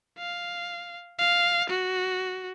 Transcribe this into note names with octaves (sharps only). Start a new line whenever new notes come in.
F5
F5
F#4